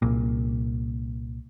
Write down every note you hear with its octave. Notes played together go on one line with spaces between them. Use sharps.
C2 A#2